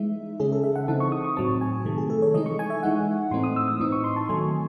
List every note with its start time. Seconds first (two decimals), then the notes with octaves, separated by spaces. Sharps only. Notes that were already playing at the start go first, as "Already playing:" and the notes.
Already playing: E3 G#3 D#4 E5
0.40 C#3 G#3 C#4 G#4
0.52 A4
0.63 E5
0.76 F#5
0.88 C#3 E3 C4 D#4 A5
1.00 C#6
1.12 D#6
1.24 C#6
1.36 A2 F#3 C4 A5
1.61 G#5
1.85 C3 D#3 A3
1.98 G#4
2.10 A4
2.22 C#5
2.34 E3 G#3 D#4 D#5
2.46 C#6
2.59 G#5
2.70 E5
2.83 E3 G#3 D#4 F#5
3.31 A2 E3 A3 C4 D#4 C6
3.44 D#6
3.56 E6
3.68 E6
3.80 A2 E3 C4 D#4 D#6
3.92 C#6
4.04 C6
4.16 A5
4.29 D#3 F#3 A3 G#5